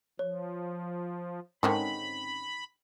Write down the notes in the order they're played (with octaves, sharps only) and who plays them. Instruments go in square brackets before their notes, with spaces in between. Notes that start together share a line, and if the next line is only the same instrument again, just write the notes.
[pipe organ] F3 [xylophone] C#5
[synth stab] G#2 C4 C#4 [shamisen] D3 D#3 G#3 [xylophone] G5 [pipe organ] B5